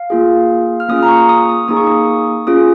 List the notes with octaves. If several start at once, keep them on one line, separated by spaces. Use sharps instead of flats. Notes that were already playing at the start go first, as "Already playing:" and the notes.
Already playing: F5
A#3 F4 G#4
F6
A#3 C#4 F4 G#4 D#6
A#5
C#6
D#6
D#6
A#3 D#4 G#4 D#6
C#6
D#6
C#4 F4 G#4 D#6